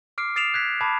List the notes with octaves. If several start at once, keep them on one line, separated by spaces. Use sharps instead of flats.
D6 F6 C7 D7
D#6 A6 C7 D7 E7 F7
F#6 G#6 B6
A5 B5 D6 G#6